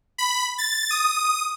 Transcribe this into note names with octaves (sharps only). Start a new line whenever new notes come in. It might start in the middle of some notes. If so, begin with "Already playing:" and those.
B5
A6
D#6